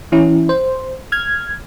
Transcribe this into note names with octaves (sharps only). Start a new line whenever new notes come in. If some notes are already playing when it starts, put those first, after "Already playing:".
E3 C#4 E4
C5
F6 G#6